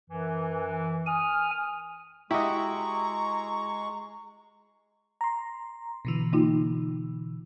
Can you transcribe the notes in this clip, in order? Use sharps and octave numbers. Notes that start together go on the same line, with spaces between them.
F#2 E3
G#5 D#6 F6
G#3 E4 F#4 G4 D#5 A#5 C#6
A#5 C6
B2 D3 E3
A#3 D#4 F4